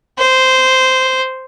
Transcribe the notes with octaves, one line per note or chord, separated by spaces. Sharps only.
C5